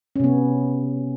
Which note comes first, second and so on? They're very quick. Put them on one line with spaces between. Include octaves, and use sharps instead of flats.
C#4 C3 B3